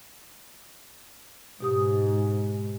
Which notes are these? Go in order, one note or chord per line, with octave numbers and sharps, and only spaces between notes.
G#2 B2 G4 D#6